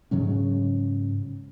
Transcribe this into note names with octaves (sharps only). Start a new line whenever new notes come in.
G#2 C#3 F#3 C#4